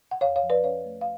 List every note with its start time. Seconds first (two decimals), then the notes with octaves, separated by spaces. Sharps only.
0.11 F#5
0.21 F2 C#5 F5
0.36 C#5 F5
0.43 F3
0.50 B4 D5
0.64 C#4 C#5 F5
0.84 A3
1.01 F5